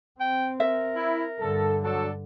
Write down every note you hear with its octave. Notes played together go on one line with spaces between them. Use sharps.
C4 G5
A#4 E5
E4
G2 D3 A4
F#3 D4 A4